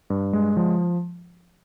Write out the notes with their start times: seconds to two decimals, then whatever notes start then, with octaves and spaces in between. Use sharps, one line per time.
0.10 G2
0.33 G#3
0.57 F3